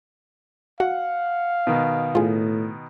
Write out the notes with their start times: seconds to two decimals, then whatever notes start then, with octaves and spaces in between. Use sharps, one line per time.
0.80 F#4 F5 F#5
1.67 B2 D#3
2.15 A2 F4 G#4